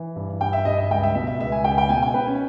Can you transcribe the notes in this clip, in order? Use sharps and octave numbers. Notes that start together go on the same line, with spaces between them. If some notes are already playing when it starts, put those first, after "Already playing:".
Already playing: E3
G2
G2 G5
E5
G2 D#5
E5
C#2 G5
E5
B2 E5
E5
C#2 E5
G#5
C#2 G5
G5
B2 G#5
G5
B2 B4
C#4